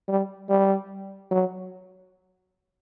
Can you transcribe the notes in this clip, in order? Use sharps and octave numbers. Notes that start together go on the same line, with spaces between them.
G3
G3
F#3